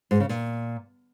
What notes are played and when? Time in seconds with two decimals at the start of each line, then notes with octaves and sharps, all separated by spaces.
0.11 G#2
0.20 C#3
0.29 A#2